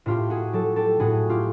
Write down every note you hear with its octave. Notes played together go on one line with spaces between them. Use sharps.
A2 F4 G4
F#4 G#4
F#3 G4 A4
G4 A4
A2 F#4 G#4
F4 G4